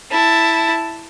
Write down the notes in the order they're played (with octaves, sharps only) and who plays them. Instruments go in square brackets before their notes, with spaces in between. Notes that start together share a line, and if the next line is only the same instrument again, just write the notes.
[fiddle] E4 A5